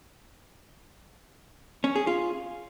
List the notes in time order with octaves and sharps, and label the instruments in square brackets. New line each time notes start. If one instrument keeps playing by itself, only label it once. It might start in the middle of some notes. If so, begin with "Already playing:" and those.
[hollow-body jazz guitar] C#4
G#4
F4